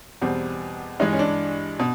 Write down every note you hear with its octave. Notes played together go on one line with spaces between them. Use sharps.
E2 B2 G3 C4
G2 E3 G#3 D#4
C#4
D4
B2